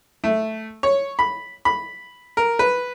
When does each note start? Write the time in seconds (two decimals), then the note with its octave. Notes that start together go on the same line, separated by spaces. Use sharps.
0.24 A3
0.83 C#5
1.19 B5
1.65 B5
2.37 A#4
2.59 B4